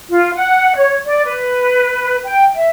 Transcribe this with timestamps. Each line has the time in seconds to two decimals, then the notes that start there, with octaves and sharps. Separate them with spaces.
0.11 F4
0.34 F#5
0.75 C#5
1.07 D5
1.26 B4
2.24 G5
2.55 E5